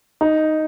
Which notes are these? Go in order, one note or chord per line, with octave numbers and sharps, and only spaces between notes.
D#4